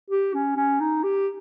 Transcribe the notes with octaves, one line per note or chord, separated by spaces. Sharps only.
G4
C#4
C#4
D#4
G4